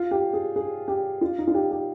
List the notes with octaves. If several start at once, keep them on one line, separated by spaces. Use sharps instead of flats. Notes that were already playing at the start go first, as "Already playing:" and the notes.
Already playing: F4
G4
G#4
G#4
G4
F4
D#4
F4
G4
G4